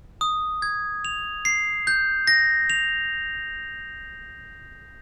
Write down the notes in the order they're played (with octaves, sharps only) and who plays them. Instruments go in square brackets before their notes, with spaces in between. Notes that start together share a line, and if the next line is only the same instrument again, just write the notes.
[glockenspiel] D#6
G#6
F7
C7
G6
A#6
F7